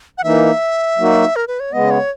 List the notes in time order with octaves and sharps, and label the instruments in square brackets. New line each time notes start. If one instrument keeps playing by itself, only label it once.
[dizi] F#5
[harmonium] E3 A#3 D#4 [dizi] E5
[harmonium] F#3 A#3 D#4 F#4
[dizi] A#4
B4
C#5
[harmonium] C#3 G#3 B3 [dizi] D#5
[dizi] C#5